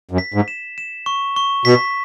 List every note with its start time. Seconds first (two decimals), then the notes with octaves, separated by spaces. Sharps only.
0.11 F#2
0.18 B6
0.34 G#2
0.48 E7
0.78 E7
1.06 C#6
1.36 C#6
1.65 B2 B6